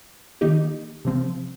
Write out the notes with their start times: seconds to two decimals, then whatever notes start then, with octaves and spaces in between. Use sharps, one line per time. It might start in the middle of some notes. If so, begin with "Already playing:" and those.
0.41 D#3 A#3 D#4 G4
1.05 C3 F3 C4